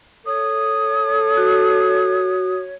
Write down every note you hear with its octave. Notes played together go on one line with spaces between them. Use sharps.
A4 C#5 D#6
F#4